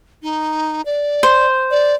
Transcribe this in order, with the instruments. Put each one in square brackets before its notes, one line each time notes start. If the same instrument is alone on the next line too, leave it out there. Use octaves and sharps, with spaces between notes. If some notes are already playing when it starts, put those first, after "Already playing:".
[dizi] D#4
D5
[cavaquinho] C5
[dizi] D5